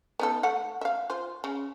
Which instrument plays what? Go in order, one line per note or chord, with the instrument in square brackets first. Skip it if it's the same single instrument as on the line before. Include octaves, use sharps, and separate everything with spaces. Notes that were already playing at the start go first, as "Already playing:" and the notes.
[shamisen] B3 D#4 A4
A3 F#5
E5 F5
F4 C5
C#3